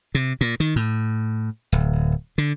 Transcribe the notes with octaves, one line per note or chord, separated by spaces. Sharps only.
C3
A#2
D#3
A2
D1
D3